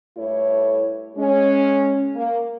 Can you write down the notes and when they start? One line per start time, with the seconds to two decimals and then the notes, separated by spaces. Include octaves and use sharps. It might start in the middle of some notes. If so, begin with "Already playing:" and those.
0.17 G2 A3 E4 A4 C#5
1.17 G#3 C#4
2.15 A#3